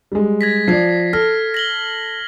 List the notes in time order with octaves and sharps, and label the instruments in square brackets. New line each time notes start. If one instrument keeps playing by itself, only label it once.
[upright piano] G3 G#3
[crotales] G#6 A#6 B6
[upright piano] F3 D5 [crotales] G#6 C7
[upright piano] A4 [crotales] F6 A#6
[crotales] A#6 F#7 G7